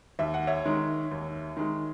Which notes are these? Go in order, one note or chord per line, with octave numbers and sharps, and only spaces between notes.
D#2 E5
F#5
C#5 E5
D#3 G#3
D#2
D#3 G#3